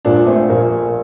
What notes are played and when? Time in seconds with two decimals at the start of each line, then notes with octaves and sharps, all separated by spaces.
0.05 A#1 A#2 F3 A#3 D4
0.26 A3 C4
0.49 A#1 A#2 F3 A#3